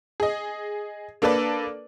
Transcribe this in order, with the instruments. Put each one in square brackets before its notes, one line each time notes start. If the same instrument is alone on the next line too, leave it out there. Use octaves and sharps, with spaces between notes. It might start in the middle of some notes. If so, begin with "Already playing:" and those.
[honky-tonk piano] G#4 D#5
A#3 D4 A4 B4 D5